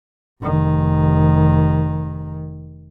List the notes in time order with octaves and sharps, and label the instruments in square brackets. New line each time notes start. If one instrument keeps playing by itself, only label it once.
[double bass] F1 D#3